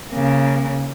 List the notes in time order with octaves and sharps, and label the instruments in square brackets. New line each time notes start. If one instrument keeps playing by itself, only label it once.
[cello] C#3 A#3